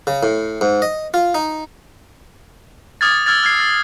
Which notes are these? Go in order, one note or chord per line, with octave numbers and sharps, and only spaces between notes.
C#3
A2
G#2
D#5
F4
D#4
D6 D#6 F6 G#6 A6
E6 F6 G#6 A6
F6 G#6 C7
A6